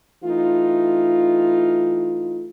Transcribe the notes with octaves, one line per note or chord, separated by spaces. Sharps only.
E3 A3 D#4 F4